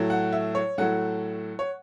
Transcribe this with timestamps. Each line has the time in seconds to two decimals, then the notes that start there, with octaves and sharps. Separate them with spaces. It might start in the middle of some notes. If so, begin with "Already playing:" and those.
Already playing: A2 F#3 A3
0.10 F#5
0.32 E5
0.55 C#5
0.78 A2 F#3 A3 F#5
1.59 C#5